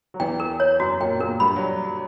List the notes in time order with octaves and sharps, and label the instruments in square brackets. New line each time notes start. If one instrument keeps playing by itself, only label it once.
[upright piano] F#3
[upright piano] E2 E3 [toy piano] G5
[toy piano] A#4
C#5
[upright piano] F#2 F#3 [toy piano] F#4
[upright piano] A#2 A#3 [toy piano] G5
[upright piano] A#2 A#3 [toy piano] A#4
[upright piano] G2 G3 [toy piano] B5
[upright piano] F#3